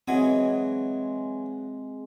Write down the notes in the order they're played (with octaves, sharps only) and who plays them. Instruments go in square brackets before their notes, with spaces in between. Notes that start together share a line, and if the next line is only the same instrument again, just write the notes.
[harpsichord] E3 F#3 G#5 [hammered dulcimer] G#3 [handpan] C4